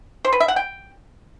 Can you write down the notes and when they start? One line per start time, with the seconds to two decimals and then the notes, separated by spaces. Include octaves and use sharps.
0.25 C5
0.32 B4
0.40 E5
0.48 F#5
0.56 G5